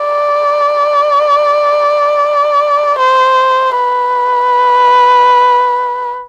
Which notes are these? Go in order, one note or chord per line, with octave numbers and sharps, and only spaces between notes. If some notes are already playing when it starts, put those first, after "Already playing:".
Already playing: D5
C5
B4